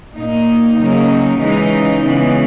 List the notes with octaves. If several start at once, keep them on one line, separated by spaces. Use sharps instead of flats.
A#2 A#3 D#4
C#3 F#3 A#3 D#4
C#3 E3 G#3 D#4
C#3 E3 G#3 B3